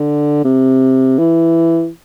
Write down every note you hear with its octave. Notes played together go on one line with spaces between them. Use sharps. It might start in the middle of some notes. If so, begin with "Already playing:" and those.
Already playing: D3
C3
E3